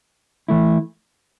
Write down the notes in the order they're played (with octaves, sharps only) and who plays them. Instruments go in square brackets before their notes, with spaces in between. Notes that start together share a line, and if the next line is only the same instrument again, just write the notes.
[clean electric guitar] E3 A3 E4